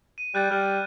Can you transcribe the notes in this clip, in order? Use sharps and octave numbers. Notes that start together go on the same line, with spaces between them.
D#7
G3 F#6 G6 A6
G3 F6